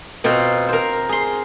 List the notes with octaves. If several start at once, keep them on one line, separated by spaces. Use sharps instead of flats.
B2 C4 F4 C5 A#5
A#4 C5
G#4 C6